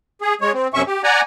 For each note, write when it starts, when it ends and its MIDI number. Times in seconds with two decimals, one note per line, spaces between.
0.21 0.34 68
0.41 0.52 56
0.41 0.52 73
0.54 0.67 60
0.74 0.82 42
0.74 0.82 48
0.74 0.82 61
0.74 0.82 76
0.74 0.82 85
0.87 1.02 67
1.04 1.21 74
1.04 1.21 78
1.04 1.21 80
1.04 1.21 82